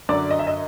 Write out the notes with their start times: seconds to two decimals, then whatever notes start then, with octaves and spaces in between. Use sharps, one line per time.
0.09 F#2 D3 F#3 D5
0.31 D#5
0.39 E5
0.47 D#5